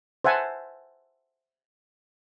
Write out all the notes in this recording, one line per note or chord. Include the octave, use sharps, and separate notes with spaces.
C5 E5 F#5 G#5 A5